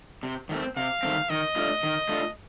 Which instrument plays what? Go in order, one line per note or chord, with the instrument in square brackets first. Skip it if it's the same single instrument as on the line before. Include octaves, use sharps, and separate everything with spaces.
[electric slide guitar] C3
D#3 A3 C4
[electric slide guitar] C3 [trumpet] F5
[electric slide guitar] D#3 A3 C4
[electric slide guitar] D#3 [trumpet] D#5
[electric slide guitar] A3 D4 F4
D#3
A3 D4 F4